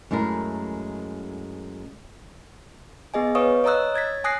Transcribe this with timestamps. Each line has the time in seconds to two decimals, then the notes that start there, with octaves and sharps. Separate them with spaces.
0.11 F#2 G#3 A3 E4 A#4
3.14 B3 G#4 D#5 G#5
3.35 B4 C#5 F5 C#6 D#6
3.64 C#5 D#5 A#5 D#6 E6 F#6
3.94 C#5 G#6 A6 B6
4.24 G#5 D#6 F#6 A#6 C7